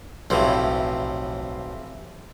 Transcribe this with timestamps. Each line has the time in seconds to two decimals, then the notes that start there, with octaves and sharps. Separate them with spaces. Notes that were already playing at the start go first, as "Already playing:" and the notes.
0.30 B1 A2 C3 E3 F3